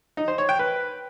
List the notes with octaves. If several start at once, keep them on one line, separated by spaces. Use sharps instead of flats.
D#4
C5
C#5
G5
B4